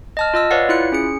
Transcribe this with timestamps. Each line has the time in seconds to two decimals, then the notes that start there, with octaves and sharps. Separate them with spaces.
0.17 D#5 A5 F6
0.34 F4 D#5 E6
0.51 B4 C#5 D5 F5 F#5
0.69 E4 F4 F#6 C#7
0.92 C#4 G#4 C#7